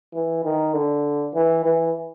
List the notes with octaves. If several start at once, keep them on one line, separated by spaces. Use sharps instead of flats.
E3
D#3
D3
E3
E3